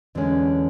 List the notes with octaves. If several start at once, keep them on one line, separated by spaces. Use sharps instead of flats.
E2 D3 G#3 C#4